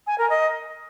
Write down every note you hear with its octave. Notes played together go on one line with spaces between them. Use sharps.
G#5
A#4
D#5